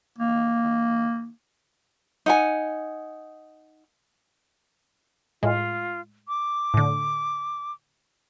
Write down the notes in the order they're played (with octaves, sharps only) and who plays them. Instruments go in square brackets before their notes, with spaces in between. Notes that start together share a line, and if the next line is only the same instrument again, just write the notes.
[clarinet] A#3
[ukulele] D#4 F#5 G#5
[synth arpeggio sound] A2 G#3 [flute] F4
[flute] D6
[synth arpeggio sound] A2 D3